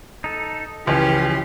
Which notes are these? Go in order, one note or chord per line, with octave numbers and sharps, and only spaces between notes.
D#4 A4
C#2 E3 F3 C#4 F4 G4